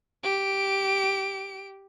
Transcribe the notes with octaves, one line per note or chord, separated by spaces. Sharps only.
G4 D7